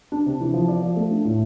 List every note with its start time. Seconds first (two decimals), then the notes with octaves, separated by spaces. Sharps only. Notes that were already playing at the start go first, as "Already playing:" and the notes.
0.12 D4
0.26 C3
0.40 E3
0.54 F3
0.68 D5
0.82 F3
0.97 A3
1.10 D4
1.25 A2